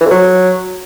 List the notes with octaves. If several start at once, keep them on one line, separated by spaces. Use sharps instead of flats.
E3
F2
F#3